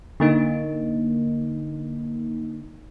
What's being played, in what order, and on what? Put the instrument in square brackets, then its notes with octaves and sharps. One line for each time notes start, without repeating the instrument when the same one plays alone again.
[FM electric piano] D3 A#3 D#4